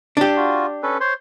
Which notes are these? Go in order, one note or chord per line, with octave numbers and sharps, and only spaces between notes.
D4 G4
F4 F#4
C#4 A4 B4
C5 C#5 C6